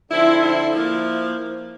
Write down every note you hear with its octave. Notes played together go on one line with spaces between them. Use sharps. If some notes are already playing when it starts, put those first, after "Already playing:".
D3 F3 C4 E4
E4
F3 A#3 E4